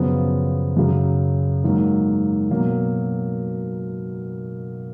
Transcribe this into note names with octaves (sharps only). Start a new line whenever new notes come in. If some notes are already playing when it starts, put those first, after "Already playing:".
Already playing: F#2 C#3 F3 B3
F#2 C#3 F#3
G#2 F#3 A#3
B2 F#3 A#3